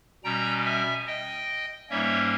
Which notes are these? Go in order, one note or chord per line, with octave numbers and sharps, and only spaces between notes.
B2 G3 C#4 G5 A#5
E5 G#5
D#5 G5
G#2 G3 A#3 C#4 C#5 E5